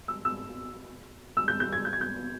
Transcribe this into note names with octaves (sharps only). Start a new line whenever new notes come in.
E6
E6
E6
G6
G6
G#6
G6
G#6
G6